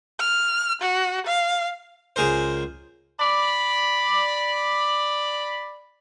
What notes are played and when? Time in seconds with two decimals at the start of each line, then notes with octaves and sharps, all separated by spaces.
0.20 F6
0.82 F#4
1.27 F5
2.16 C#2 G#4 A#4 C5
3.20 D5 B5